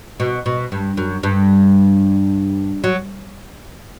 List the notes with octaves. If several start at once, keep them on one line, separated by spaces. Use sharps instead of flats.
B2
B2
G2
F#2
G2
F#3